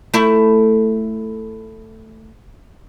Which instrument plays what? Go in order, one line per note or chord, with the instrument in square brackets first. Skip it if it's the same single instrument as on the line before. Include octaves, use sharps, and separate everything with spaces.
[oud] A3 E4